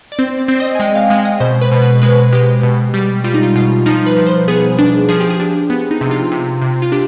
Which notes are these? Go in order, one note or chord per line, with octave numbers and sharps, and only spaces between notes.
D5
C4 C5
D5
C4
D#5
G#5
G#3 G5
F5
G#3 F5
D#5
B2 C5
B4
B2
B4
G#3 B4
G#3 G4
B2
G3
G3 F4
D#4
F4
B2 F4
F3 D#4
B4
F3
C5
B3 G#4
D4
F3 G#4
G4
G#4
D4
B3
D#4
C3
F4
C3
C3
F4
D4 G4